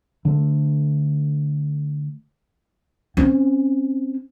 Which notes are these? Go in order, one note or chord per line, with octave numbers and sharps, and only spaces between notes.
D3 A3
C4 C#4